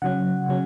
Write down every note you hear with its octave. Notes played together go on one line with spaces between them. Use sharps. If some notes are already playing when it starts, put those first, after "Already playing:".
C#3 F#3 C#4 F#5
C#3 F#3 C#4